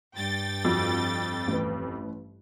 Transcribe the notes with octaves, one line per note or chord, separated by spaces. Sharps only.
G2 G5 A6
F2 F#4
A1 B4